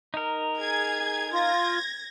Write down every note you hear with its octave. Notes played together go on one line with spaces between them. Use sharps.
D#4 A#4
G#4 G#6
F4 G#6 A#6